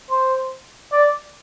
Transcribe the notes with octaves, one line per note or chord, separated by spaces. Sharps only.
C5
D5